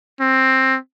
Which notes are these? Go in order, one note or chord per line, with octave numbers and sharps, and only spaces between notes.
C4